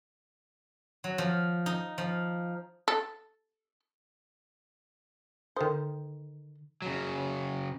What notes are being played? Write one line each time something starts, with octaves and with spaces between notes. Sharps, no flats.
F#3
F3
D#4
F3
A4
D3 D#3 A4 C5 D#6
C#3 F#3